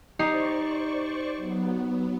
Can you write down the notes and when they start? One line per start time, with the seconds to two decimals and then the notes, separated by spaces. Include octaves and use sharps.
0.19 D#4 G4 C5 D5 C#6 C7
1.37 F#3 B3